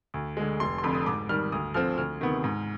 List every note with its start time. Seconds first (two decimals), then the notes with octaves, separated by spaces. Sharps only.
0.14 D2
0.37 D3 G#3
0.60 F1 C6
0.78 C6
0.83 F2 D3 B5
0.94 D#6
1.06 G#2 D6
1.29 D#3 G3 F6
1.52 D2 D#6
1.74 D3 F3 C4 F6
1.98 D2 F6
2.20 C3 D#3 B3
2.44 G#2